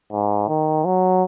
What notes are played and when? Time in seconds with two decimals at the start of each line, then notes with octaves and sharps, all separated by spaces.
0.12 G#2
0.48 D#3
0.85 F#3